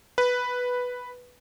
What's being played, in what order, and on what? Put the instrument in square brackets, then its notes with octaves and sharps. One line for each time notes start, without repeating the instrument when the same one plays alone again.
[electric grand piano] B4